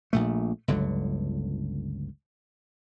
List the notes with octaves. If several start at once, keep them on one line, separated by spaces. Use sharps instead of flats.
A#1 A#2 A3
G1 C#2 D3 F#3